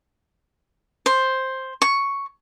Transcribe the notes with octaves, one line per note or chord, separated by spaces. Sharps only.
C5
C#6